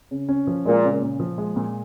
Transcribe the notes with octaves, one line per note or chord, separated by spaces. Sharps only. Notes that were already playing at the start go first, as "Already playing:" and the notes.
C#3
C#4
F3
A#2 G#3
C#3
A#2
F3
G#3
A#2